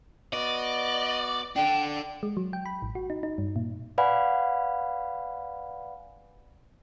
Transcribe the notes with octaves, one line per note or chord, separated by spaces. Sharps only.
B3 F#4 D5 D#5
D4 A4 G5
G#3
F#3
G5
B5
A1
F#4
D#4
D#4
G2
A#2
B4 D5 F5 F#5 G#5 B5